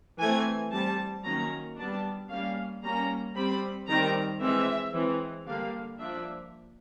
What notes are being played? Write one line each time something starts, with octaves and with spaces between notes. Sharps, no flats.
E3 A3 C4 G#5
G3 C4 A5
D#3 F#3 A#3 C#4 A#5
G3 B3 D4 A5
G3 A#3 C#4 F5
G3 A#3 C#4 A#5
G3 C4 B5
D#3 G3 C4 A#5
E3 G#3 C4 E5
E3 G#3 C4
D3 G3 A#3 F5
F3 A#3 D4 E5